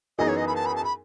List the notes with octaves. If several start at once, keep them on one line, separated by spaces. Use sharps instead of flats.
F#2 E3 B3 D#4 G#4 D#5
C#5
D#5
B5
A5
B5
A5
B5